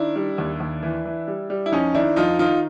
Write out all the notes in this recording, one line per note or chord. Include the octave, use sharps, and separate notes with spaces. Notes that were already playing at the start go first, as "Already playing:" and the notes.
Already playing: D#3 D4 E4
G3
D#2
D#2
E3
E3
G3
G3
E4
F2 C#4 D#4
D#3 D4 E4
F2 D#4 F4
D#3 D#4 F4